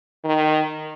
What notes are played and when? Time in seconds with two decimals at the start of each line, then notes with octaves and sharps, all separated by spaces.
0.25 D#3